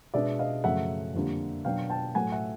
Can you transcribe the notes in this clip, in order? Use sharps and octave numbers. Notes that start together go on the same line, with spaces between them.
B2 G#3 B3 D4 D5 E5
D#5 F5
F#2 C#3 F3 A3 E5 F#5
F2 D3 G3 A#3
B2 F#3 B3 D4 F5 G5
G5 A5
A2 F#3 A3 F#5 G#5
E5 F#5